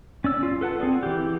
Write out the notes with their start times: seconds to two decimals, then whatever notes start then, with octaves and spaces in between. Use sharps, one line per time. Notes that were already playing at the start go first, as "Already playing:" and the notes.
0.24 C#4 D5 E6
0.43 F4
0.61 A4 B4 F#5 A5
0.80 C4 G#4 D5
1.03 E3 G4